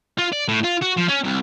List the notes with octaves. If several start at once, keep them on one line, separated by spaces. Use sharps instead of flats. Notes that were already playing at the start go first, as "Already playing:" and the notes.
F4
D5
A2
F4
F#4
F3
C#4
C2